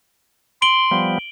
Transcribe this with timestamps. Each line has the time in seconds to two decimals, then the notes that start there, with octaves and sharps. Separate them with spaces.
0.62 C6 D7 F#7 G7
0.91 F3 G3 B3